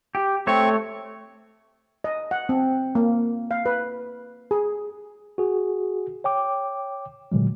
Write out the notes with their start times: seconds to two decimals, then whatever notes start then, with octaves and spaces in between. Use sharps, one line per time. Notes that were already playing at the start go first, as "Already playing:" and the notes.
0.15 G4
0.47 A3 C4 C#5 C#6
2.04 D#5
2.31 F#5
2.49 C4
2.95 A#3
3.51 F5
3.66 B4
4.51 G#4
5.38 F#4 G#4
6.24 C#5 G5 D6
7.32 A#2 D3 F#3 G#3